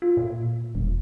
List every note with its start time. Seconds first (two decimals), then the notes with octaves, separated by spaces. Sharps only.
0.02 F4
0.17 A#2
0.75 E1